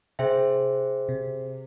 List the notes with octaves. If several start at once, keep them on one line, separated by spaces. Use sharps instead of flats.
C3 G#4 C5 E5 G5
C3